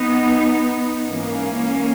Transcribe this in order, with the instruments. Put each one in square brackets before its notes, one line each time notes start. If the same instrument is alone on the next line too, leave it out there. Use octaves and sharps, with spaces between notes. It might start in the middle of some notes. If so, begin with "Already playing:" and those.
Already playing: [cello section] B3 D#4
G#2 E3 A#3 C#4